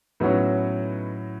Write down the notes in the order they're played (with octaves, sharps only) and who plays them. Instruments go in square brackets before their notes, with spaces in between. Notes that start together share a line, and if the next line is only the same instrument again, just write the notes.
[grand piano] A2 F#3 C#4 F#4 [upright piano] B3 D#4